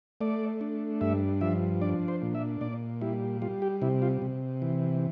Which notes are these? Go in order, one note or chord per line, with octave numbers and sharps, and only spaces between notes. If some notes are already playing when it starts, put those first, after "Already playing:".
A3 D5
D4
G2 E5
F3 E5
D4 D5
C5
A#2
E5
A#2 D5
G3 E4
G3 F4
G4
C3 E4
F4
C3
E3